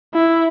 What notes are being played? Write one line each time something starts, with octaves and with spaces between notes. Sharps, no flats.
E4